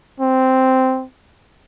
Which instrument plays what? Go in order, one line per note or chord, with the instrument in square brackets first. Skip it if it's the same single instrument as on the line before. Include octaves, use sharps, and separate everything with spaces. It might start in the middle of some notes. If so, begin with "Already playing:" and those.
[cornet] C4